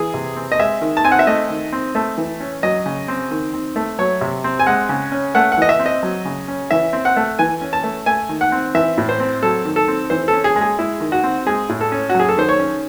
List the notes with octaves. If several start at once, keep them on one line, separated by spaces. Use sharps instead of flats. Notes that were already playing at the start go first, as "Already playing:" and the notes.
Already playing: E3 G#4
C3
C4
D#5
G#3 E5
D#3
A5
C4 G#5
F#5
E5
A3 D#5
D#3
C4
A3
E3
C#4
F#3 D#5
C#3
C4
D#3
C4
A3
F#3 C#5
C3
C4
G#5
G#3 F#5
C#3
C#4
A3 F#5
F#5
E3 D#5
E5
C4
D#5
F#3
C#3
C#4
E3 E5
C4
F#5
A3
E3 G#5
C#4
A5
A3
A3 G#5
D#3
F#5
C4
E3 E5
A2
C5
C4
F#3 A4
D#3
A4
C4
E3 C5
A4
C#4
G#4
G#3
G#4
G#3 E4
D#3
F#4
C4
G#3 G#4
A2
A4
C#4
F#4
F#3
G#4
A4
D#3 C5
C#5
C#4